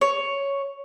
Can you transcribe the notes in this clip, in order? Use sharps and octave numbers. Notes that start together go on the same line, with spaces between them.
C#5